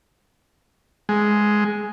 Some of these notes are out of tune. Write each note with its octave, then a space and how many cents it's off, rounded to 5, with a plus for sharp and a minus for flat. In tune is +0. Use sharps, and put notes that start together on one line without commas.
G#3 +5